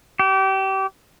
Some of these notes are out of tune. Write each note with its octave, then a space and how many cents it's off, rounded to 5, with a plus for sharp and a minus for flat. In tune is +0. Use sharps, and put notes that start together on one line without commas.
G4 -30